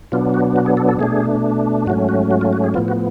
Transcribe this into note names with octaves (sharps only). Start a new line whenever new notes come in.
B2 F#3 B3 D4 F4
F#4
F#4
G#4
A4
A4
B2 A3 D4 G#4
G#2 F#3 A3 C#4 F#4
F#4
F#4
F4
F#4
G#4
A2 F3 B3 F4
F#4